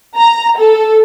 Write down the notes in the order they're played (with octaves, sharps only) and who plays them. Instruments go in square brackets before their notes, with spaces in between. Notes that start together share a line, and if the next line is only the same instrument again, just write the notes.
[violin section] A#5
A4